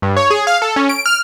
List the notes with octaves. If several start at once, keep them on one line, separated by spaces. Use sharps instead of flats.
G2
C#5
G#4
F5
A4
C#4
D7
F6